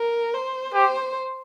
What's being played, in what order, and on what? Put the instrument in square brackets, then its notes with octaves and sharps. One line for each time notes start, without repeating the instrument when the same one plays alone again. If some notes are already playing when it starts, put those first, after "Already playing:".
Already playing: [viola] A#4
C5
[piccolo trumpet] G4 [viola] C5